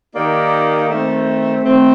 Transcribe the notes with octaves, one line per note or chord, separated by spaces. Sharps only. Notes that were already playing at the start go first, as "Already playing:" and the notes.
D#3 A#3 D#4 G4 D5
D#3 A3 C4
D#3 A3 C4